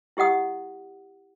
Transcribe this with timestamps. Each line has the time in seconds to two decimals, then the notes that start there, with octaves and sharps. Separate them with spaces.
0.17 E4 G4 D#5 F#5 D#6